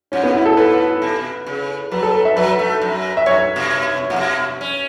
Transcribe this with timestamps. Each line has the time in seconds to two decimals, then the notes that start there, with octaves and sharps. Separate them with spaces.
0.12 A2 C#4
0.24 B3
0.35 E4
0.46 A4
0.57 A2 B4
1.02 B2
1.47 C#3
1.91 F#3 B4
2.03 A4
2.15 B4
2.25 E5
2.36 F#3 B4
2.59 A3
2.82 F#2
3.17 E5
3.26 F#2 C#5
3.56 B2
4.10 A2
4.16 B2
4.61 C#4